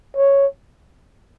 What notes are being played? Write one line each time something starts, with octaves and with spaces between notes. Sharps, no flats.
C#5